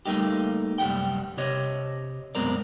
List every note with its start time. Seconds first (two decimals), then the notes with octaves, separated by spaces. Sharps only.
0.06 G3 A3 A#3 D#4 G4
0.78 C2 F#2 G3 F#5 G5
1.38 C3 G4 C#5 D#5
2.35 F#2 B2 G#3 C4 A#4 D5